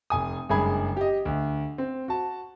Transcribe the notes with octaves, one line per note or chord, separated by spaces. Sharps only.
F1 G#5 D#6
F#1 G2 G#3 G#4 B5 G#6
G4 D#5
D2
C4
F#4 A5